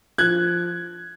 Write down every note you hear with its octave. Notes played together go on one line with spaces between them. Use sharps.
F3 F#6 G#6